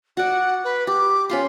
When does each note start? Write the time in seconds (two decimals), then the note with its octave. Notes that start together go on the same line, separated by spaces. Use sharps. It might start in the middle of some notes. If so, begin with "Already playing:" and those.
0.17 F#4 D5 F#5
0.64 B4
0.87 G4 D6
1.30 C#4 F4 B5 C6